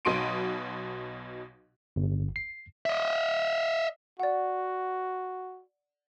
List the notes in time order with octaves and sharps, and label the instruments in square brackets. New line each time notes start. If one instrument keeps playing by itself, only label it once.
[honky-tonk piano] B1 B2 D#4 C6 D7 D#7
[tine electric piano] G1
C7
[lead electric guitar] D#5 E5
[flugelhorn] F#4 [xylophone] D5 F#5